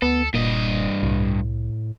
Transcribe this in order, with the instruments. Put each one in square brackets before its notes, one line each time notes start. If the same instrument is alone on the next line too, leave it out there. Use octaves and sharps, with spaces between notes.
[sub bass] D2 [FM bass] B3 [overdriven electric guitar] A4
[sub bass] E1 [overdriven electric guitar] G2 D#5 [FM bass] A#2
[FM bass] C2 [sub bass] A2